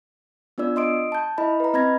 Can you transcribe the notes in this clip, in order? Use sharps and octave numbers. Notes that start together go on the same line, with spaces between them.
B3 D4 F4 D5 E6
D#5 C6 D#6 D7
A5 G6
E4 D#5 B5
B4 A#5
C4 D#5 B5 G#6 A#6